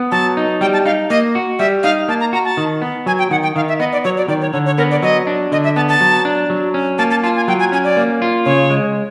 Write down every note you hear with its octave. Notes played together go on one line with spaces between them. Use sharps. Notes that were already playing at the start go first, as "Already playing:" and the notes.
Already playing: B3
F#3 A5
D#4
G3 G5
A5
D#4 F5
A#3 D#5
F#4
G3 E5
D#4 F5
A#3 A5
A#5
F#4 A#5
A5
D#3
B3
F#3 G#5
G5
D#3 F#5
G5
D#3 F5
E5
B3 D#5
D5
F#3 C#5
D5
D#3 D5
C#5
D3 C#5
C#5
B3 A#4
D5
F#3 D#5
D4
D3 D#5
E5
B3 A5
A5
F#3
D4
F#3
C#4
A#3 A5
A5
F4 A5
G#5
F#3 G5
G#5
C#4 G#5
D5
A#3
F4
C#3 C#5
G#3